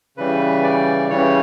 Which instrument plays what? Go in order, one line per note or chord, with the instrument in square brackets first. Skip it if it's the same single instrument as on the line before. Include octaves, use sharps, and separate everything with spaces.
[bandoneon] C#3 E3 G3 B4
D5
C#3 E3 G3 C#5